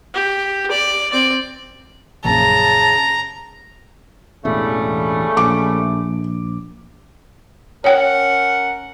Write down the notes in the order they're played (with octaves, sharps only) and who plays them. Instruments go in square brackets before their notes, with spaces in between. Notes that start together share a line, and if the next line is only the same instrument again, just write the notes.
[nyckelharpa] G4
D5
C4 D5
[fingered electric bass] A#1 F#2 [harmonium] C#3 [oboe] A5 [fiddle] A#5
[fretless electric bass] E1 A1 E2 [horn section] C#3 G3 A3
[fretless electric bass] A#1 [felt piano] D6
[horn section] C#4 A#4 F#5 [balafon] C#5 G5